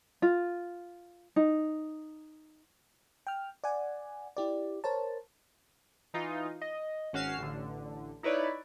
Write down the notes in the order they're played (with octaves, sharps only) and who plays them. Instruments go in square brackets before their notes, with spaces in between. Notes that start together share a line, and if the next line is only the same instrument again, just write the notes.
[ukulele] F4
D#4
[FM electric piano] G5 F6
D5 F#5 G#5
E4 G4 D5
A#4 C5 C#5 A5
[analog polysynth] E3 D#4 F4
D#5
G#1 C#4 F#4 F5 C7 E7
A1 D3
D#4 E4 B4 C#5 D5